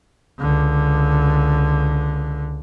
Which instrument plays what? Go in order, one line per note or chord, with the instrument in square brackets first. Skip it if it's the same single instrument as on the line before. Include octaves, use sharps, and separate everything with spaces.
[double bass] C#2 D3